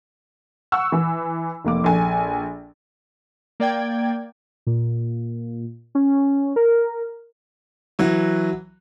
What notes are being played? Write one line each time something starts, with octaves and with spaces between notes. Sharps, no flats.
F#5 C#6 E6
E3
F1 A#3 D6
A#1 A4 G#5
A#3 D5 G5 G#6
A#2
C#4
A#4
E3 F#3 F#4